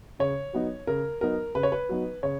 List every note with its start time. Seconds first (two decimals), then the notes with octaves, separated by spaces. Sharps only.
0.19 C#3 C#5
0.53 F#3 B3 D#4
0.87 C#3 A#4
1.21 F#3 B3 D#4 A#4
1.55 C#3 B4
1.63 C#5
1.72 B4
1.89 F#3 B3 D#4
2.23 C#3 C#5